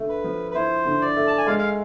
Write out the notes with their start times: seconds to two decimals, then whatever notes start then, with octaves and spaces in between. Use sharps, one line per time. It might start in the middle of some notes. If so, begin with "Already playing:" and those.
Already playing: D3 A3
0.09 B4
0.24 F3
0.51 B4
0.54 E4 C5
0.85 D3
1.01 D5
1.16 A3
1.27 A5
1.38 G#5
1.47 G#3 F5
1.59 F5